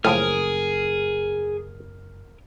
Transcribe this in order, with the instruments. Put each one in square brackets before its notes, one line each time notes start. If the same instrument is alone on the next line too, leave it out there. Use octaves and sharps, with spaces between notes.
[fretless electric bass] F#1 [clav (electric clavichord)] A2 F3 [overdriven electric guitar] G#4 [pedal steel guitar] A#4 D#6 F6